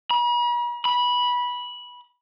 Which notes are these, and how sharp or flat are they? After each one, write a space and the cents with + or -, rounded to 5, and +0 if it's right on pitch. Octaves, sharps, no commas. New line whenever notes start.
B5 -45
B5 -15